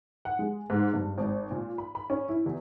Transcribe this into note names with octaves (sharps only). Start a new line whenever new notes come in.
F#5
G#3
G#2
G2
G#1
A#2
B5
B5
C#4
E4
E2